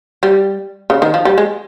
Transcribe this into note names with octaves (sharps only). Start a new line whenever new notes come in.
G3
C#3
D#3
F3
G3
G#3